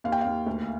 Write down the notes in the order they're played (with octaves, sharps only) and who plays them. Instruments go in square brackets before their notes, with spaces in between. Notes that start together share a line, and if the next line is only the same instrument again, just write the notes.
[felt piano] D#2 F5
G5
D#2 F5
D2